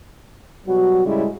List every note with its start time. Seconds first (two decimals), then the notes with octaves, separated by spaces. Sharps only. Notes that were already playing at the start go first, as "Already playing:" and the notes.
0.67 B2 F#3 G3 F#4
1.06 A2 C#3 G3 G#3 E4